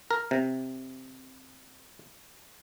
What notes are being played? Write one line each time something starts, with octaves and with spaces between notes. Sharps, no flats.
A#4
C3